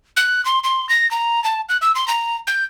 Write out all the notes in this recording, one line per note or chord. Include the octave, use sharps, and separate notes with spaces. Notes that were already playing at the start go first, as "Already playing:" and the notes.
F#6
C6
C6
A#6
A#5
A5
F#6
E6
C6
A#5
G6